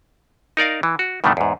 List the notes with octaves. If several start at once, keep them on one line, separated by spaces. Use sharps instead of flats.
D#4 A#4 D5 F5
E3
F#4
G2 B2 D3 D#3 A3
E2 G#2